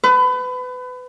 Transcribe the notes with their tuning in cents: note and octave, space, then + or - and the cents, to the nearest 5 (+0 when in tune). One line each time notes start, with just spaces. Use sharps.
B4 +30